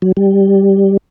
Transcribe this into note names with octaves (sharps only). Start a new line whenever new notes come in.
F#3
G3